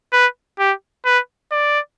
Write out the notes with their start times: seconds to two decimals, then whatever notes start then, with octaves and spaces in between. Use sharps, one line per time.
0.13 B4
0.58 G4
1.05 B4
1.52 D5